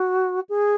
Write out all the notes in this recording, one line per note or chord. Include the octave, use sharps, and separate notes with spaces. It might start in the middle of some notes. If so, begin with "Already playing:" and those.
Already playing: F#4
G#4